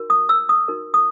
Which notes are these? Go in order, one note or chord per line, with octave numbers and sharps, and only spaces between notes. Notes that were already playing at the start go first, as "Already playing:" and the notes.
Already playing: D#4 F#4 A#4
D#6
E6
D#6
D#4 F#4 A#4
D#6